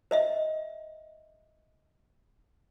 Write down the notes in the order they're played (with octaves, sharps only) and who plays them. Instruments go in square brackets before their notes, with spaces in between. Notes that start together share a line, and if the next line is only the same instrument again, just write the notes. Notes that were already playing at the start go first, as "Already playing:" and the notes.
[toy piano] C5 D#5 E5